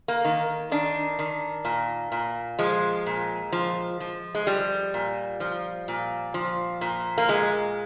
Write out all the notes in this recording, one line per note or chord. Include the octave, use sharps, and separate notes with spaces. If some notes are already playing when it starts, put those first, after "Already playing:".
A#3
D#3
D#3 D4
D#3
A#2
A#2
F3 G#3
A#2
F3
F3
G#3
F3 G3
A#2
F3
A#2
F3
A#2
A#3
A#2 G#3